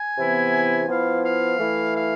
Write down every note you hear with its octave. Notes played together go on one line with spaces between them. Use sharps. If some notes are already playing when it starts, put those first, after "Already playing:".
Already playing: G#5
C3 E3 B3 E4
F3 B3 E4 F5
F5
E3 A3 E4
F5